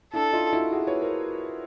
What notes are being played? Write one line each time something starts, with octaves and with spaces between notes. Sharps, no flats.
D4 E4 A4
D#4 F4
E4 F#4
F#4 G#4
B4 C#5
A#4 C5